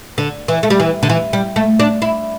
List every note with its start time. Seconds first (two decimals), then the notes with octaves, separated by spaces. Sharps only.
0.18 D3
0.48 E3
0.63 A3
0.70 G3
0.80 E3
1.03 D3
1.10 E3
1.33 G3
1.56 A3
1.79 D4
2.02 E4